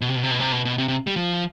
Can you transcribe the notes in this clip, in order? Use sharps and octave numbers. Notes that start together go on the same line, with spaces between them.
B2
C3
B2
C3
B2
C3
B2
B2
C3
C3
G3
F3